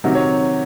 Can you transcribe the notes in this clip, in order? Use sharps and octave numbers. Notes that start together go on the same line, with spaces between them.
C3 D#3 F#3
C#5